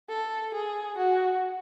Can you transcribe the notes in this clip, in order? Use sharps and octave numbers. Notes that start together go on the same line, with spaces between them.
A4
G#4
F#4